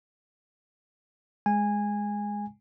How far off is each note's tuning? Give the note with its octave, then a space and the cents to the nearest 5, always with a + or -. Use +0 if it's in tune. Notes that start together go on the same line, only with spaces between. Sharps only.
G#3 +0 G#5 -15